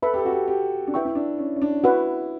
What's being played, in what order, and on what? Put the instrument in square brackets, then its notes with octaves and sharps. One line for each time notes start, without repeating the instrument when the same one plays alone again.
[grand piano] A4 [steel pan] B4 E5 B5
[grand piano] G4
A4
F#4
G4
G4
D4
[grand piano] E4 [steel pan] B4 E5 G5 C#6
[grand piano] E4
D4
C#4
C#4
D4
[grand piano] E4 [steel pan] F#4 B4 F#5